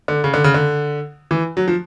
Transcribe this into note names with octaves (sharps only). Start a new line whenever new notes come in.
D3
C#3
D3
C#3
D3
E3
F#3
F3